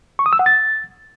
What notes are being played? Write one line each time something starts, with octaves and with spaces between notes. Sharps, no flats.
C#6
D#6
E6
F#5
A6